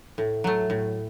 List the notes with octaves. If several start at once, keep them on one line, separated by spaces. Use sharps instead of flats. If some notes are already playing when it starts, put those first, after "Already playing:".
A2
F#3 A3
A2